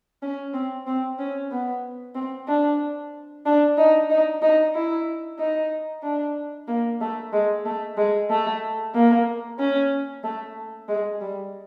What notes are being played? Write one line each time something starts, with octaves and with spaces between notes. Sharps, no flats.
C#4
C4
C4
C#4
B3
C4
D4
D4
D#4
D#4
D#4
E4
D#4
D4
A#3
A3
G#3
A3
G#3
A3
A#3
C#4
A3
G#3
G3